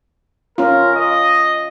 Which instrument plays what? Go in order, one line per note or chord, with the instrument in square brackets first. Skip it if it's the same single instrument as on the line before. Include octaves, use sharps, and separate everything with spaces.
[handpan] C#4 F4 [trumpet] A#4
[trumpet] D#5